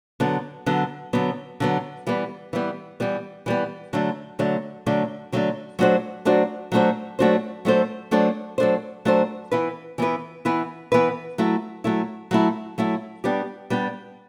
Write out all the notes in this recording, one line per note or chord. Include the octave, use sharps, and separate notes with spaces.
D3 F#3 B3
D3 F#3 B3
D3 F#3 B3
D3 F#3 B3
E3 G3 B3
E3 G3 B3
E3 G3 B3
E3 G3 B3
D3 F#3 A3 D4
D3 F#3 A3 D4
D3 F#3 A3 D4
D3 F#3 A3 D4
F#3 A3 D4 F#4 C5
F#3 A3 D4 F#4 C5
F#3 A3 D4 F#4 C5
F#3 A3 D4 F#4 C5
F#3 A3 D4 A4 C5
F#3 A3 D4 A4 C5
F#3 A3 D4 A4 C5
F#3 A3 D4 A4 C5
E3 B3 E4 B4
E3 B3 E4 B4
E3 B3 E4 B4
E3 B3 E4 B4
F#3 A3 E4
F#3 A3 E4
F#3 A3 E4
F#3 A3 E4
G3 B3 D4 G4
G3 B3 D4 G4